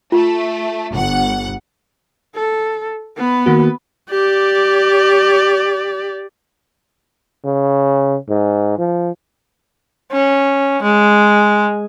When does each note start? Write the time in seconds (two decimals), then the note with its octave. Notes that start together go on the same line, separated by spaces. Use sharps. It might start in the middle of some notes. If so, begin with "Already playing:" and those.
0.12 A3 F4
0.92 G1 F#5
2.35 A4
3.17 B3 B4
3.46 D#3 A#3 F#4
4.10 G4 D5
7.45 C#3
8.29 G#2
8.78 F3
10.13 C#4
10.83 G#3